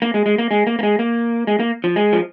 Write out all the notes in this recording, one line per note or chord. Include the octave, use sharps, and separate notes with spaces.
A#3
G#3
G#3
A#3
G#3
A#3
A#3
G#3
A#3
G#3
A#3
F3
G#3
F3